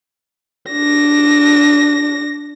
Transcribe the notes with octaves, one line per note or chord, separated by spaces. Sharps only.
D4 A#6